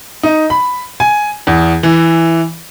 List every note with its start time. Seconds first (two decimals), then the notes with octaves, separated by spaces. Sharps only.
0.23 D#4
0.50 B5
1.00 G#5
1.47 E2
1.83 E3